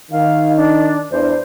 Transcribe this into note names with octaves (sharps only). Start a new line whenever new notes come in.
D#3 F5
D4
E2 D4 C5